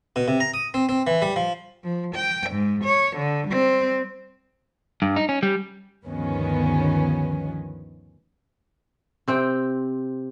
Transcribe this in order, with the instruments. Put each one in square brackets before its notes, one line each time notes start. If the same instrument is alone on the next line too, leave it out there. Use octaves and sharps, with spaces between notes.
[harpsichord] B2
C3
A#5
D#6
C4
C4
E3
G3
F3
[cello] F3
G5
G#2
C#5
D3
G3 C4
[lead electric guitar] G2
D#4
C#4
G3
[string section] D2 G2 D#3 F3 B3 C#4
[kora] C3 C4 G5